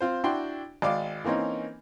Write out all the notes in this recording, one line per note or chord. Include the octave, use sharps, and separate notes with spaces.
C4 F4 C5
D4 E4 F#4 G5 C6
G#1 D5 F5 D6
E3 A#3 C4 C#4 D#4